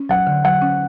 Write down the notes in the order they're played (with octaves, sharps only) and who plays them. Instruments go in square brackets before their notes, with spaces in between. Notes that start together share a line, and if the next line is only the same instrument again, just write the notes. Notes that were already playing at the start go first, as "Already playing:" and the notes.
Already playing: [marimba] C#4
[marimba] F#3 [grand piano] F#5
[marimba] D3
[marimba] F#3 [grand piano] F#5
[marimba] C#4